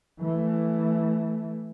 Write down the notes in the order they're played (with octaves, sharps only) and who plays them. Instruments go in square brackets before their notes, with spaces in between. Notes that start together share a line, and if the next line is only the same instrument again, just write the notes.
[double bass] E3 A3